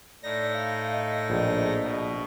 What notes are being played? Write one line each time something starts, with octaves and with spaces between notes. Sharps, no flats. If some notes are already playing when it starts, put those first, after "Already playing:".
A2 D#4 D5 A#6
F5
D#5
A#1
B2